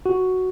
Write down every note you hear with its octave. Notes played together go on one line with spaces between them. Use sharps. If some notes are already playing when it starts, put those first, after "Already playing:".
F#4